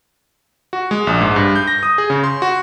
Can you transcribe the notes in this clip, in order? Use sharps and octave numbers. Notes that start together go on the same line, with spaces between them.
F#4
G#3
A#1
G#2
G2
G6
A#6
D#6
G#4
C#3
C6
F#4